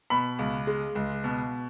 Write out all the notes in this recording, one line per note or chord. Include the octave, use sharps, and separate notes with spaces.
B2 B5
C#2
G#3
C#2
B2